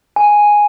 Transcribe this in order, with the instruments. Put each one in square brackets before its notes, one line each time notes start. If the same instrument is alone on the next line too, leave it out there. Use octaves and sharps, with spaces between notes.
[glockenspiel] G#5